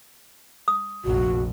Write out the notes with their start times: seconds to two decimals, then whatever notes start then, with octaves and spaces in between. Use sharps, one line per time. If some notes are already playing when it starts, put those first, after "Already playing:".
0.68 D#6
1.05 F1 A#1 F#4